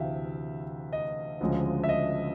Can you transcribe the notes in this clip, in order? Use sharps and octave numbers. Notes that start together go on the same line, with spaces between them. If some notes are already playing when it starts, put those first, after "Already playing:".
Already playing: D2 C3 E3 E5 F5 G5
D#5
D2 C#3 F3 G#3
E5
D#5